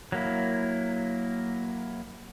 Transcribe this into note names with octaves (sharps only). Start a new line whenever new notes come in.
F#3 A#3 E4